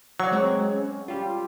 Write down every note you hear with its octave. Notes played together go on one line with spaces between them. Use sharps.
F#3 C#5 D5 C#6
G#3 C4
C#4
G3 F4 G5